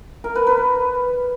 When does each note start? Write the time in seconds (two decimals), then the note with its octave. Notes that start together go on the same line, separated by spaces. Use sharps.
0.24 A#4
0.35 B4
0.47 B4